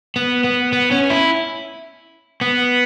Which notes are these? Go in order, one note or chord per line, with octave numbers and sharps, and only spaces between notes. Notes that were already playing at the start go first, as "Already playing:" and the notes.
B3
B3
B3
C#4
E4
B3